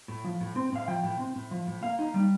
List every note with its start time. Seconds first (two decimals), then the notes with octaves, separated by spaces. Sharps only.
0.08 A2
0.24 F3
0.40 A2
0.56 C4
0.72 A2 F5
0.88 F3 G5
1.03 A2
1.19 C4
1.35 A2
1.51 F3
1.67 A2
1.83 A#3 F5
1.99 D#4
2.14 G3